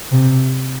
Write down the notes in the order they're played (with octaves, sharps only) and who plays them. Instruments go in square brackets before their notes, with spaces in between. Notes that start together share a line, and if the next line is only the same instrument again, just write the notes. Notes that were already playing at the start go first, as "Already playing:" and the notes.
[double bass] C3